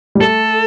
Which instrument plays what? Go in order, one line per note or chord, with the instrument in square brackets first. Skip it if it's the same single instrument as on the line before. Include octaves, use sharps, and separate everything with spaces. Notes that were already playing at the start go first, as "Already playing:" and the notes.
[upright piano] G3
[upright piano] A3 [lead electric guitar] A4